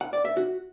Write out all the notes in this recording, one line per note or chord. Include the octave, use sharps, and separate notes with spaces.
F#5
D5
E5
F#4